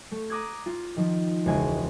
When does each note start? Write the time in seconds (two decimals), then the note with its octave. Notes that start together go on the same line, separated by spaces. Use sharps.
0.11 A3
0.30 A#5 D6 D#6 F#6 G#6
0.66 F4
0.96 D#3 F3
1.46 E1 C#2 G#5 D7